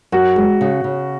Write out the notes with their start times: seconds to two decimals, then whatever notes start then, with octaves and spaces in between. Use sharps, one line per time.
0.12 F#2 F#4
0.36 G#3
0.61 C#3
0.84 C#3